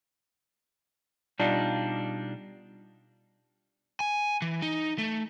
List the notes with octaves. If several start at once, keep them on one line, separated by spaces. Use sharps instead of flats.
B2 G3 D4 D#4 F4
G#5
E3
D#4
A3